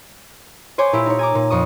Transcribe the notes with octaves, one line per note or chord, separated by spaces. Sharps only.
C5 C#5 G#5 C6 D6
A#2 E4 G4
D#4 C#5
G#5 A#5 D6
A#2
F2 C#6 D#6